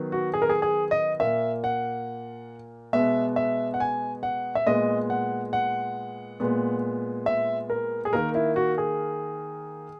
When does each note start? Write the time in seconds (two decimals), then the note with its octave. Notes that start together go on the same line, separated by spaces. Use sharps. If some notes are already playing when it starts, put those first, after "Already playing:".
Already playing: D#3 F#3 B3
0.12 F#4
0.34 G#4
0.42 A#4
0.49 G#4
0.62 G#4
0.91 D#5
1.20 A#2 A#3 E5
1.64 F#5
2.93 B2 G#3 B3 E5
3.36 E5
3.74 F#5
3.80 G#5
4.23 F#5
4.55 E5
4.67 A#2 G#3 B3 D#5
5.10 F#5
5.53 F#5
6.40 A#2 G#3 B3
7.26 E5
7.70 A#4
8.05 G#4
8.13 D#3 A#3 A#4
8.35 E4
8.56 F#4
8.78 G#4